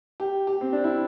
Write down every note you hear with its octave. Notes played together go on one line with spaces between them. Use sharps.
G4
G4
C4
D4
E4